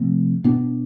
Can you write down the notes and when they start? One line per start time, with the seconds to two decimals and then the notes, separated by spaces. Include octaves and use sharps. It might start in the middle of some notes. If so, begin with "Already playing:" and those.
Already playing: C3 F3 A3 C4
0.44 B2 B3 D4